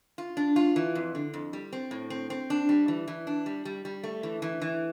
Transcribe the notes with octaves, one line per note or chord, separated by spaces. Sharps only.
F4
D4
F4
E3
F2
D3
F2
G3
C4
A2
C4
C4
D4
G3
E3
E3
D4
G3
G3
G3
A3
E3
E3
E3